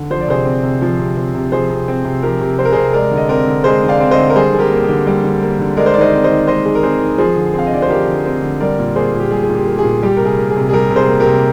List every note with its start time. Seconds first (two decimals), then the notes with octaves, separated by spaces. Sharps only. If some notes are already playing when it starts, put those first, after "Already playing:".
Already playing: D3
0.10 F3 C5
0.20 D5
0.28 C3 G#4 C5
0.45 C4
0.63 C3
0.82 F3
0.99 C3
1.17 C4
1.35 C3
1.52 F3 G#4 C5
1.70 C3
1.88 C4
2.05 C3
2.22 F3 G4 A#4
2.41 C3
2.59 C4 C5
2.65 A#4
2.72 C3 G#4 C5
2.93 G#3 A#4 D5
3.11 D3
3.17 D#5
3.29 C4 A#4 D5
3.47 D3
3.64 G#3 G#4 C5
3.83 D3
3.88 D5 F5
4.00 C4
4.11 C5 D#5
4.18 D3
4.30 A#4
4.35 G3 G#4 C5
4.53 D3 G#4
4.59 G4 A#4
4.71 A#3
4.83 G4
4.89 D3
5.07 G3
5.24 D3
5.42 A#3
5.59 D3
5.77 G#3 A#4 D5
5.86 C5
5.94 D#3 D5
6.01 C5 D#5
6.12 C4
6.24 C5 D#5
6.30 D#3
6.47 G#3 C5 D#5
6.65 D#3 G#4
6.75 A#4
6.83 C4 G#4 C5
7.01 D#3
7.18 F3 G#4 C5
7.37 D3
7.54 C4 F5
7.66 D#5
7.72 D3 D5
7.82 C5
7.89 F3 G4 A#4
8.07 D3
8.26 C4
8.42 D3
8.60 G3 A#4 D5
8.79 A#2
8.96 A#3 G#4 C5
9.14 A#2
9.20 G4
9.31 G3 G#4
9.43 G#4
9.49 A#2
9.56 G4
9.67 A#3
9.78 G#4
9.84 A#2
10.03 G3 G4
10.17 C3 A#4
10.25 G#4
10.38 A#3
10.50 G#4
10.56 C3
10.69 G#4
10.72 G3 G4 A#4
10.91 C3
10.96 G#4 C5
11.08 A#3
11.20 G4 A#4
11.26 C3